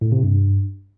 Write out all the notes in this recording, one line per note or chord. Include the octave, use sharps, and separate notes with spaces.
A2
C3
G2